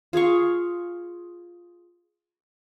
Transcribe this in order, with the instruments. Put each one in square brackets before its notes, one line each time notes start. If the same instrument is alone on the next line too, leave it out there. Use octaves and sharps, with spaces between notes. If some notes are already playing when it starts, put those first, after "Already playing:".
[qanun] F4 G#4 F5 C#6